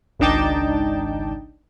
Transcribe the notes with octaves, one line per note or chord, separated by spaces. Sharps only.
G#1 C#2 D4 D#4 G5 A5